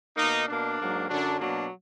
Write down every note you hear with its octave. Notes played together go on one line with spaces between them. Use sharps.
B2 A#3 D#4
B2 A#3 D4
G#2 F#3 A#3
F#2 D3 F#3 D4
B2 F#3 A#3 D4